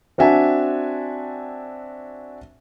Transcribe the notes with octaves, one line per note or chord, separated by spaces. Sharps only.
C4 D4 F#4 E5 G#5 A5